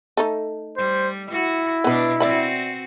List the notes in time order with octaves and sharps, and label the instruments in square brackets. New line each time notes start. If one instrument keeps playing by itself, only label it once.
[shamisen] A3 D#4 A4
[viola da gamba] G3 [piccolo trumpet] C5
[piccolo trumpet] E4 [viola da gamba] F#4
[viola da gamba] B2 D4 [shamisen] B3 B4
[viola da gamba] C4 F#4 [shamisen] D5 E5 B5